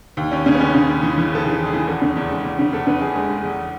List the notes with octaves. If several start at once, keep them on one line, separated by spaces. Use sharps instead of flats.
D#2
D#2 C#4
C#3 C#4
B3
D#2 C#4
C#3
D#2
E3
E3
D#2 A4
E3 G#4
D#2
G#4
E3
E2 A4
C#3
E2
G#3
E2
C#3
E2 A4
C#3 B4
E2 G#4
G#3
G#3
E2